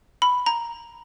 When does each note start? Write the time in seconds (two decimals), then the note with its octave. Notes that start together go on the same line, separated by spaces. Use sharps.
0.22 B5
0.46 A#5